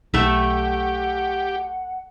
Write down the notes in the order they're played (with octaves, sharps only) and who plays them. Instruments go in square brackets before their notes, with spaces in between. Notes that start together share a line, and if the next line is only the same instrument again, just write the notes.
[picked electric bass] B1 [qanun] A3 E5 [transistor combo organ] G4 [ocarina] F#5